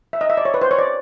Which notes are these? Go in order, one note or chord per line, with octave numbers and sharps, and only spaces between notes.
E5
D#5
E5
D5
C#5
B4
C5
C#5
D5